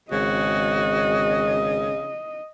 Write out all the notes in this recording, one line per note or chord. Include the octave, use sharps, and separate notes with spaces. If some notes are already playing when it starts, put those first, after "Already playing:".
G#1 C#3 F#4 D#5